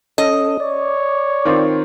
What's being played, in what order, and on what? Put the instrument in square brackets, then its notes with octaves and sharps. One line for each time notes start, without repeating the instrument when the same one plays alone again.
[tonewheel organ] C#4 A4 [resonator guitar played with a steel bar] D#5
[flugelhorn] C#5 [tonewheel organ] D5
[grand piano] D#3 C4 F4